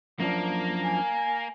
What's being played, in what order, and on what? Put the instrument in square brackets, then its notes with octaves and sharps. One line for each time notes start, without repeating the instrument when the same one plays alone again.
[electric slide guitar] F#2 F3 D4 [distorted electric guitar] A#3
[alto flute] G#5